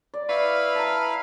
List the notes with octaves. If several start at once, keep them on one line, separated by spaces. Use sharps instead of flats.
D5
E4 B4 F5 C#6 F6
A5 A#5